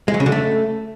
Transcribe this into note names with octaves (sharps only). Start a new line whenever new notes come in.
G#3
F#3
C#3
D3
A3